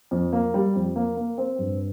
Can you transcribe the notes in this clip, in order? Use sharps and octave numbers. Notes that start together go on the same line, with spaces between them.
F2
A#3
G3
F2
A#3
A#3
C4
G2